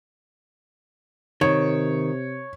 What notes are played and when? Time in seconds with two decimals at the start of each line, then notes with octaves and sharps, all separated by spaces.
1.41 C3 D#3 C#5